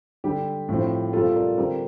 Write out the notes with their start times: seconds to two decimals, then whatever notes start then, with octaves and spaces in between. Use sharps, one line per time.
0.24 D3 G3 D4 G4
0.69 A2 F3 C4
1.13 C3 G3 C4 F4 A4
1.35 A#4 D5
1.58 D3 G3 C4 G4 A#4